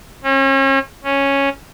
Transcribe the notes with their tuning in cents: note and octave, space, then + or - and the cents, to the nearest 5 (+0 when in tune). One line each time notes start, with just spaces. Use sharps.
C#4 -40
C#4 -5